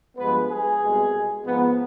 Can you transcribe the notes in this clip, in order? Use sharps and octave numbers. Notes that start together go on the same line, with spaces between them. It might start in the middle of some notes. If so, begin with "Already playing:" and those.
G2 F3 G#3 B3 B4
G#4
C2 B2 G#3
G#2 F3 B3